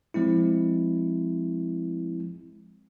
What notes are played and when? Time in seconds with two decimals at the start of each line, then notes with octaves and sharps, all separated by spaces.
0.14 F3 G#3 C4 E4